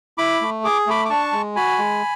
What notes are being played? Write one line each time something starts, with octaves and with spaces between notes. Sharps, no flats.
E4 B5 D6
A3
G#4 D6
A3 B5 D6
D6
D4 A5 C#6
G#3
F#4 G#5 B5
G#3